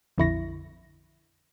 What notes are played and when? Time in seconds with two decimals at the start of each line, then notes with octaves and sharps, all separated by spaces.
0.18 A#1 F2 D3 E4 C#6 A#6